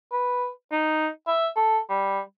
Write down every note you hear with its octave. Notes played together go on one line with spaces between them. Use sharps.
B4
D#4
E5
A4
G3